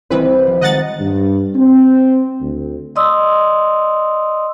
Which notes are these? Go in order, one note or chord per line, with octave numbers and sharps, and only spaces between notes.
C2 C3 E3 C4 B4 D#5
F3
D#3 G#3 D#5 F#5 A#5 A6
G2
C4
D2
D5 D#5 C6 D#6 E6